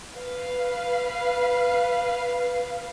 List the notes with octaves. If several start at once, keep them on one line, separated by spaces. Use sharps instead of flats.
B4 F5